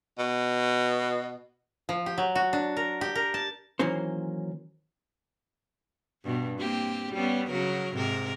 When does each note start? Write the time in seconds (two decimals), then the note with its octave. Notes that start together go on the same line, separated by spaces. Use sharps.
0.18 B2
1.89 F3
2.06 G4
2.18 F#3
2.35 F#4
2.53 D4
2.77 A#4
3.01 G4
3.15 A#4
3.34 A5
3.79 D#3 E3 F#3 A#3 C#4 C5
6.23 G2 B2
6.59 A#3 C4 G4
7.14 G3 B3 C#4
7.50 C#3 F#3 A#4
7.95 G#2 C3 A#4